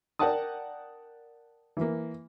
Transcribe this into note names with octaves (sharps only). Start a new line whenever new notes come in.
A#4 D5 F#5 G5 A5 D#6
E3 A#3